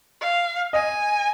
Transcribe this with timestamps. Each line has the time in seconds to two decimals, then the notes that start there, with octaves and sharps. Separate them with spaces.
0.21 F5
0.73 D#5 G#5